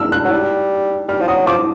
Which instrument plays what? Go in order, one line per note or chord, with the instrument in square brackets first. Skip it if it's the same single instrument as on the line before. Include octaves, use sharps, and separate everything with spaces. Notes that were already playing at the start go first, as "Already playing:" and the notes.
Already playing: [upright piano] E6 F6
F#6
[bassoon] F#3
G3
[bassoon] G3 [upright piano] F6
[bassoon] F3
[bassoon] F#3 [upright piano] D#6
[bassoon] F3 [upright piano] D6